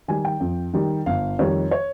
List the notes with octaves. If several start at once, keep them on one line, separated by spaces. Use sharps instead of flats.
D#3 G3 G#5
G5
F2
D#3 G3
G1 F5
F2 D#3 G3 C#5
C#5